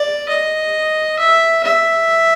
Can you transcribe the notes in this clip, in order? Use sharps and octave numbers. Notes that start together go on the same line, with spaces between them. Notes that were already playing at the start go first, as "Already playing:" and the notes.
Already playing: D5
D#5
E5
E5